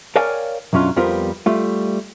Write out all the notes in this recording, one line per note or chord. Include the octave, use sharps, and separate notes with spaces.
A#4 C#5 D5 F5 G5 G#5
B1 F#2 F#3 C#4 D4 F4
F2 G3 B3 F4 A#4 C5
G3 A3 F4